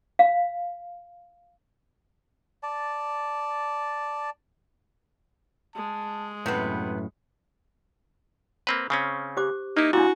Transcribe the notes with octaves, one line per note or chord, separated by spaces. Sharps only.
F5
D5 A5
G#3 A5
F#2 A2 C3 B3 B4
A#3 C4 B4 B5
C#3 C4 C#4
G4 C5 D6
A#3 D#4 E4
A#2 D4 E4 F#4